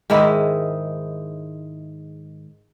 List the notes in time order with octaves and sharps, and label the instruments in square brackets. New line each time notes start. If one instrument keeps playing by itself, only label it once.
[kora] G#2 D#3 G#3 E4